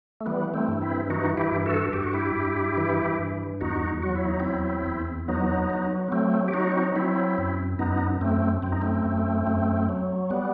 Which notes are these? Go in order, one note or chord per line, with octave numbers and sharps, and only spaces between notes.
A3
E3 G3 B3
A3 C4
G2
C4 E4
E3 D#4 F#4
E4 G4
G2
F#4 A4
G2 G4
F#4
E4 G4
G2
E3
G2
E2 D#4 F#4
F#3 F#4
E4
D#4
E2 C4 E4
E2
F#3 B3 D#4
F#3
B3
F#3 A3 C4
G4
F#3 D#4 F#4
C4
D#4
F#3 C4 E4
F#2
F#2 B3 D#4
F#2 A3 C4
F#2 C4
D#4
A3 C4
F#2
F#2
F#3
G3 B3